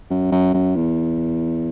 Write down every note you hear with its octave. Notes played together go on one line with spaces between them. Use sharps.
F#2
F#2
F#2
E2